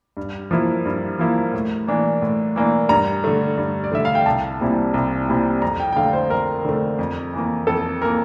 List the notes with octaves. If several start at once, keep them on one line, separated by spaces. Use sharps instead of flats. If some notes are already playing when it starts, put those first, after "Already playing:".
G2
F3 A#3 E4
G2
F3 A#3 E4
A2
E3 A#3 D4
A2
E3 A#3 D4
G2 A#5
D3 A3
G2
D5
D3 A3 E5
F5
G5
C2 A5
A#2 G3 C4 E4
C2
A#2 G3 C4 E4
F2 A#5
G5
G5
D3 A3 F5
C5
F2 A#4
D3 A3
F2
E3 A#3
F2 A4
E3 A#3 A#4